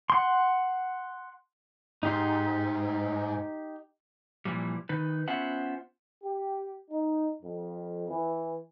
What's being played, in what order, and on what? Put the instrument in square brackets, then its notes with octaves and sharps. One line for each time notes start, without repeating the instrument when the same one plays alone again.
[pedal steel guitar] F#5 C6
[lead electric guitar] G#2 [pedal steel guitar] D#4 G4 C6
[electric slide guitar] A#2 E3 F3 G3
D#3 D#4 B4
B3 C#4 F4 C5 E5 F#5
[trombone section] G4
D#4
F2
E3